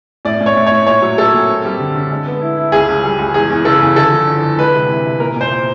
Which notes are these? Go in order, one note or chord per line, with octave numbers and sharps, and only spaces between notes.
A2 D5
A2
C#5
A2
C#5
A2
A#2 C#5
F#3
A#3 A4
A#2
C4
G3
D3
D3
G#3
B3
E4
E4
C#2 G#4
C#2
G3
C#2
E2 G#4
E2
C#3 A4
E2
D3 A4
F3
D3
D3
G#3 B4
C3
E3
C3
A#2 A#4
A#2 C5
A#2